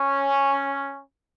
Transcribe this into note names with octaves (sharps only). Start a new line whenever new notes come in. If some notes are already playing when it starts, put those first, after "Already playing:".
Already playing: C#4